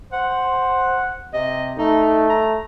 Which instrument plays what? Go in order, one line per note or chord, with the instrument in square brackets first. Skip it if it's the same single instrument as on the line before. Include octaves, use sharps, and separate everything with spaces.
[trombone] C5 [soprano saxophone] F#5
[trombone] C3 [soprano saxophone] D#5
[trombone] A3 [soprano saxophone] D#4
[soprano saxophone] A#5